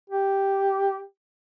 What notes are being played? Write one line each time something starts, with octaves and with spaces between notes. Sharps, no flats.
G4